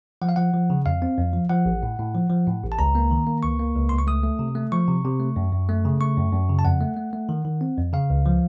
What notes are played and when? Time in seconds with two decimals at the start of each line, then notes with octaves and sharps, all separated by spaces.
0.22 F3 F#5
0.29 F5
0.36 F3 F#5
0.53 F3
0.70 C#3
0.86 F2 F5
1.02 C4
1.18 F2
1.33 F3
1.49 F3 F#5
1.66 A1
1.83 A2
1.99 A2
2.15 F3
2.30 F3
2.47 A2
2.63 A1
2.72 A5
2.79 C#2 A#5
2.95 A#3
3.11 D#3
3.27 A#3
3.43 C#2 C#6
3.59 A#3
3.75 C#2
3.89 C#2 C6
3.98 C#6
4.07 A3 D#6
4.23 A3
4.39 C3
4.55 A3
4.72 F3 C#6
4.88 C3
5.05 C3
5.20 A3
5.36 F#2
5.52 F#2
5.69 A3
5.85 C#3
6.01 A3 C#6
6.17 F#2
6.32 F#2
6.49 C#3
6.59 A5
6.64 F2 F#5
6.81 A3
6.97 A3
7.13 A3
7.29 D#3
7.45 D#3
7.61 C4
7.78 F2
7.93 C#3 F5
8.10 C#2
8.26 F3